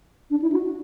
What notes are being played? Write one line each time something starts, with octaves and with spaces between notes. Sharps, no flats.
D4
E4
F#4